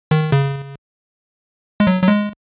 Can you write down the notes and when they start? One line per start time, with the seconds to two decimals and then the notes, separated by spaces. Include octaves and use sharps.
0.11 D#3
0.32 C#3
1.80 G#3
1.87 F#3
2.03 F#3
2.08 G#3